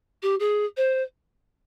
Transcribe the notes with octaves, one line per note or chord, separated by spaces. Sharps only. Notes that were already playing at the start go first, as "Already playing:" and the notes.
G4
G#4
C5